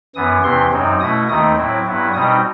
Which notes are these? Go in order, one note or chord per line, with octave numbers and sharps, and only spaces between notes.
F#2 E3 B3 D#6
E2 C3 E3 C6
F#2 F#3 C4 D#4
B2 A3 E4 D#6
D#2 D#3 A3 C4 D#4 D#6
A2 F#3 C4 E4
G2 F#3 B3 E4
B2 G3 C4 D#4 D#6